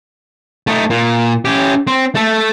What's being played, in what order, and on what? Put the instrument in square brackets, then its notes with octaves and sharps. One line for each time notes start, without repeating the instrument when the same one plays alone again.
[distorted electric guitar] A3 D#4
A#2
C#4 G4
C4
A3 A4